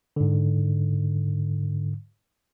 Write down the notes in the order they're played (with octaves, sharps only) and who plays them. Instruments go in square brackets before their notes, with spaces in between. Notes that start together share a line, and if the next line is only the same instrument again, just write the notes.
[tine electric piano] G#2 D3